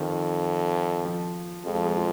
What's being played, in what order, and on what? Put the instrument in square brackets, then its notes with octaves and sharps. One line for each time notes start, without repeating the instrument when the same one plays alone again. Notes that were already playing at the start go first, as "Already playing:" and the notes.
Already playing: [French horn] F2 [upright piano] D#3
[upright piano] F3
[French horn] F2 [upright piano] G#3
[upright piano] F3
G#3
F3